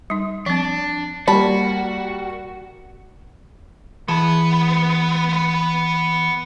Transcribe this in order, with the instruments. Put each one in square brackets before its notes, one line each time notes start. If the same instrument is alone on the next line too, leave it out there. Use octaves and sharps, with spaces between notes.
[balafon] G3 D#4
[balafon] F3 C4 [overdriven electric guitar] D4
[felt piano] G3 A#3 [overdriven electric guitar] F#4 [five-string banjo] A5 B5
[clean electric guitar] E3 G#4 A5 [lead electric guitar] B3 B4